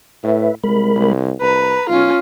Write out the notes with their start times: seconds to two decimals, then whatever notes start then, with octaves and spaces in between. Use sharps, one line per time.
0.24 A2 B4 E5
0.64 C2 G#3 A#4 B5
0.96 C2
1.42 C2 B4 A#5
1.90 B1 C#4 F4